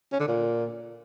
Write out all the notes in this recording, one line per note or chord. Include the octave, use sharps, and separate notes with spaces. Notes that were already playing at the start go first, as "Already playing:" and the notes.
C#4
D3
A#2